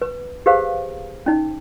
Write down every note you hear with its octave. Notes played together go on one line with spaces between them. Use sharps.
B4
G4 G#4 B4 C5 F5
C#4 D#4